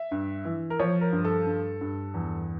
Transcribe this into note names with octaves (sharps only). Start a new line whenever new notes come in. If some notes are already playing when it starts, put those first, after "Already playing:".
Already playing: E5
G2
E3
A#4
F3 C#5
A#4
G2
A4
G2
G2
E2